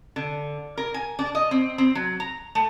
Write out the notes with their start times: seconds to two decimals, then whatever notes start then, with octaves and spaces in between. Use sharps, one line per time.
0.16 D3
0.77 A#4
0.94 G#5
1.19 D4
1.35 D#5
1.51 C4
1.78 C4
1.95 F#3
2.20 A#5
2.55 A3